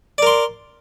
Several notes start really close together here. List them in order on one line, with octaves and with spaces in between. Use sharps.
D5 A#4 C6